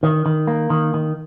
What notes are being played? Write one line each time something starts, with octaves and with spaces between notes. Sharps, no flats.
D#3
D#3
A#3
D#3
D#3